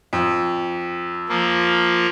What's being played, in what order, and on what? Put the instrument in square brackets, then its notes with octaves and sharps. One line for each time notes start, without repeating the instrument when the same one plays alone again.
[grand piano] F2
[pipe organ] F3 A#3